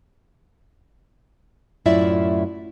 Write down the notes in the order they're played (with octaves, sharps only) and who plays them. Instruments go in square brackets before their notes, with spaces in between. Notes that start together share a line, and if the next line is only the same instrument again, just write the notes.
[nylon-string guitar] F#2 A2 E4 F4 D5 E5